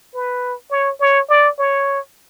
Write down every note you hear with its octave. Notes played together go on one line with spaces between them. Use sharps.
B4
C#5
C#5
D5
C#5